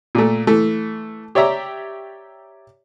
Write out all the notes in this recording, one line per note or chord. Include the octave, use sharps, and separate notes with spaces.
A#2 A3
E3 A3
G4 C#5 D5 E5 A#5